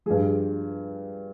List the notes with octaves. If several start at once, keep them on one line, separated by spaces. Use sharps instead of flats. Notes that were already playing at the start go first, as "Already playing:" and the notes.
G2 F3 G#4